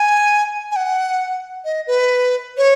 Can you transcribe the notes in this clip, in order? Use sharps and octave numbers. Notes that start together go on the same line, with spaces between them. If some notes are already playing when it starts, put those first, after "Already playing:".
Already playing: G#5
G#5
F#5
D#5
B4
C#5